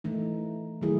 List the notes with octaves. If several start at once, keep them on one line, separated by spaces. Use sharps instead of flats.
E3 A3 D#4
D#3 F#3 A3 E4 G#4